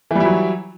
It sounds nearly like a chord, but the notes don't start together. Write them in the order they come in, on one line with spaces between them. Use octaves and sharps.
E3 G3 E4 F#3